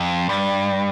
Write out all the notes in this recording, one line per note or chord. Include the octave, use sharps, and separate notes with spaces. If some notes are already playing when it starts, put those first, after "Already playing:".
Already playing: F2
G2